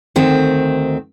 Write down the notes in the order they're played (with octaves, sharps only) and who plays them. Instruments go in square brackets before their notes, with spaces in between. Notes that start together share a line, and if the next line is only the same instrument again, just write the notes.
[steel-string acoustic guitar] D2 D#3 C4